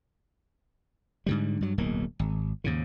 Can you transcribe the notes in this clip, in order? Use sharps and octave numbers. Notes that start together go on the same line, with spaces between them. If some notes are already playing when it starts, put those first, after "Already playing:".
G#2 D3 G3
G2 F#3
D1 B1 G#2 A#3
G#1
D#2 G#2 C#3